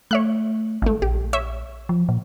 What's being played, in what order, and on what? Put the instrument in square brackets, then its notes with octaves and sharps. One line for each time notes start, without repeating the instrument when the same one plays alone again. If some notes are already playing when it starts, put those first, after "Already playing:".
[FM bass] A3 [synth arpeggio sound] C#5 E5 F#6
[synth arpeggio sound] G#1 A3
[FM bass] A#1 [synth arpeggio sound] G4
[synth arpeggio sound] C#5 E5
[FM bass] F3
A#2